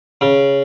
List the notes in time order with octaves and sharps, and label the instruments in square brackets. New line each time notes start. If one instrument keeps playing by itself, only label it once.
[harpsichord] C#3